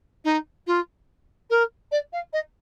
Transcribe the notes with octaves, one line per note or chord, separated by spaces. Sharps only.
D#4
F4
A#4
D5
F5
D#5